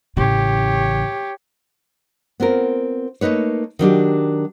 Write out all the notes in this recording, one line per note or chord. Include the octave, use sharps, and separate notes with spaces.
A1 C#3 G4 C#5
B3 C4 F4 A#4
A3 A#3 D#4 B4 C#5
D#3 F#3 D4 G4